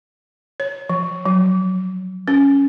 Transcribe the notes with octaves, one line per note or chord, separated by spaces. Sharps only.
C#5
F3
F#3
C#4